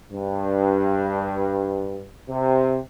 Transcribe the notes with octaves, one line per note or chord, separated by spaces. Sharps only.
G2
C3